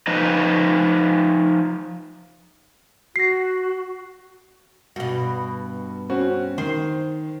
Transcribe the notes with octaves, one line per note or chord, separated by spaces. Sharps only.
F3 D#4 B4 D#5
F#4 A#6 C7
G2 B2 F#4
C4 C#4 F#4
D#3 C5